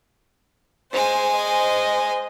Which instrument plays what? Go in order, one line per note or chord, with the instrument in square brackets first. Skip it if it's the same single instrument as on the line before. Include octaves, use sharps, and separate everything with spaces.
[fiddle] G#3 G#5 [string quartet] C5
[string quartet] C5 D#5